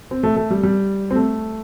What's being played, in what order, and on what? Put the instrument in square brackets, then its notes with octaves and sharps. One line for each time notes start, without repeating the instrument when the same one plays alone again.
[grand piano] C4
A3
A3
G3
G3
C4
A3